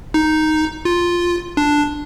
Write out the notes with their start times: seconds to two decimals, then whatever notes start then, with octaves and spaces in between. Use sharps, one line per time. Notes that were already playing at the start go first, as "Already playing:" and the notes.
0.14 D#4
0.85 F4
1.57 D4